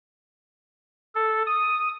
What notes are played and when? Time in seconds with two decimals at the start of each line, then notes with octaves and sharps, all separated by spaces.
1.15 A4
1.47 D#6